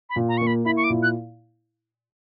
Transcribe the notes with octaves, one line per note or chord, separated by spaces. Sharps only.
B5
A#2
A#5
A#3 C#6
B5
E4 B5
C#6
D6
A#2
F#6